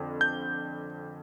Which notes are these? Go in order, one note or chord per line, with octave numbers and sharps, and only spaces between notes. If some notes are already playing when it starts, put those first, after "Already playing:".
Already playing: F2 D3
G6